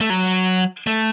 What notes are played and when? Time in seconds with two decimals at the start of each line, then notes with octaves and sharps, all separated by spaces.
0.01 A3
0.10 F#3
0.87 A3